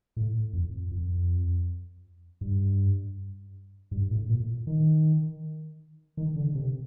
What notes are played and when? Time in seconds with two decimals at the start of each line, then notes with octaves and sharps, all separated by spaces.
0.17 A2
0.53 F2
0.91 F2
2.41 G2
3.91 G2
4.11 A2
4.29 A#2
4.67 D#3
6.17 D#3
6.36 D3
6.55 C3